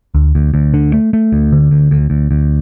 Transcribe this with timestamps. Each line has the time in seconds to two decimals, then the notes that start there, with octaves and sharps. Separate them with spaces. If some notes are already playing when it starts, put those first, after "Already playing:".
0.15 D2
0.35 D2
0.54 D2
0.74 D3
0.94 A3
1.13 A3
1.33 D2
1.52 D3
1.71 D2
1.91 D2
2.10 D2
2.31 D2